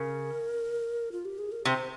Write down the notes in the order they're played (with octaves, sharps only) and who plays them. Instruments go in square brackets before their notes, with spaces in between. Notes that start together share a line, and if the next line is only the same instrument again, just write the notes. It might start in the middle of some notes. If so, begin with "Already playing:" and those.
Already playing: [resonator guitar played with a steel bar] C#3 [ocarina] A#4
[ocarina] F4
G4
G#4
A#4
[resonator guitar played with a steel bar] C3 [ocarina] C5